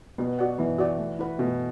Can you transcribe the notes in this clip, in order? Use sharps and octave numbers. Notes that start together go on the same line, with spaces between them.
B2 B3
F#4 D5 F#5
E3 B3
F#4 D5 F#5
A3
E4 B4 F#5
B2 A3